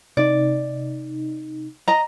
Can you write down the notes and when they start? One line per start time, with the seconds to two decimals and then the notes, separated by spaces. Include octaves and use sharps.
0.17 C3 D#4 D5
1.88 D#5 A#5